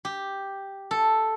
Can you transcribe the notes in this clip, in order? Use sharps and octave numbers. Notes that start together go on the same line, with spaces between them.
G4
A4